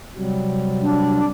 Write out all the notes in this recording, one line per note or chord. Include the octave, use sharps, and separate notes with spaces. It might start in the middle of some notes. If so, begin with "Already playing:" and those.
C3 F#3 G3
D4